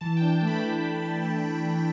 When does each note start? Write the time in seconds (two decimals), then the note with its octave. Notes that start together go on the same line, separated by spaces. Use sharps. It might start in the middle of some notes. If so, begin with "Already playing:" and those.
0.01 E3 A5
0.17 D4 G5
0.42 A3
0.47 B5
0.62 E3
0.83 E3
1.04 D4
1.14 B5
1.24 A3 A5
1.39 E3 B5
1.65 E3
1.70 B5